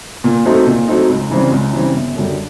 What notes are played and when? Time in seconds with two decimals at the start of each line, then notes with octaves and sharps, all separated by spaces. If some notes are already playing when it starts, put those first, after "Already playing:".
0.24 A#2
0.46 F#3 A3 C4 D#4
0.67 A#2
0.88 F#3 A3 C4 D#4
1.09 C#2
1.30 C#3 E3 G3 C4
1.52 C#2
1.73 C#3 E3 G3 C4
1.94 G1
2.16 F#2 D3 G3